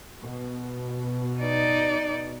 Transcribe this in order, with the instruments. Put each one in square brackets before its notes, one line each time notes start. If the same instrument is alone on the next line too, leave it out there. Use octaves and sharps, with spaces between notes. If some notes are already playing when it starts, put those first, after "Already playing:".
[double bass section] B2
[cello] D#4 D5